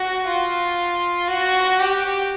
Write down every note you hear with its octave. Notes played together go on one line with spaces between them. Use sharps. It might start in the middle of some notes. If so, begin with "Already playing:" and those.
Already playing: F#4
F4
F#4
G4